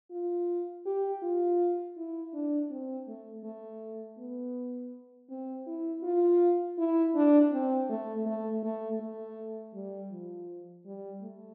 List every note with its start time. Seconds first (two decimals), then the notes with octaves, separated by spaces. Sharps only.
0.11 F4
0.85 G4
1.22 F4
1.96 E4
2.33 D4
2.70 C4
3.08 A3
3.44 A3
4.18 B3
5.29 C4
5.67 E4
6.03 F4
6.78 E4
7.15 D4
7.52 C4
7.89 A3
8.26 A3
8.63 A3
9.00 A3
9.74 G3
10.11 F3
10.85 G3
11.22 A3